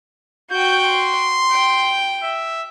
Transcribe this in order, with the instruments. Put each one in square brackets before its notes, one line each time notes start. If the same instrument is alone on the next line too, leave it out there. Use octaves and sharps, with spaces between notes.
[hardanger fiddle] F#4 G5 [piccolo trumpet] G6
[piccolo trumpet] C6
[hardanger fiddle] G5
[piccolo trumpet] E5